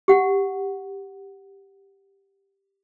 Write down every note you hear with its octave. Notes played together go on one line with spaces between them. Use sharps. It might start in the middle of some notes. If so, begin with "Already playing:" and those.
G4 F#5